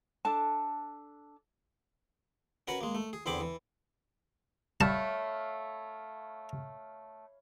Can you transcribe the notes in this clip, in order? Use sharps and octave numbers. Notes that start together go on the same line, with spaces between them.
D4 A4 A5
C#4 F#4 A#4 B4 F#5
G#3 A#3
A3
G#4
E2 D3 C4 G#4 B5 D6
E3
G3 A3 C#5 F5 A5 B5